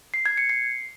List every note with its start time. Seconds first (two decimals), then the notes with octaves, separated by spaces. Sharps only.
0.14 C7
0.26 G#6
0.38 C#7
0.49 C7